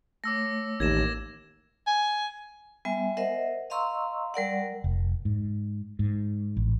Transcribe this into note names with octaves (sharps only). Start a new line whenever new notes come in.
A3 C#5 D6 E6 A#6
A1 D#2 G#6 A#6 E7
G#5
G3 B3 E5 G#5
A#4 C5 D#5 E5 F#5
D#5 F5 A#5 C6 C#6 E6
G3 A#4 D5 F#5
F1
G#2
G#2
A1